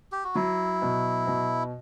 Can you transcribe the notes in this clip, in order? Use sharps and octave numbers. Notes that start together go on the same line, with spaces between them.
G4
F#4
F#3 E4
B2
B2